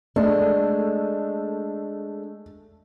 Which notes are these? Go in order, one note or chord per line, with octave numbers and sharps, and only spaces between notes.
G#3 A3 D4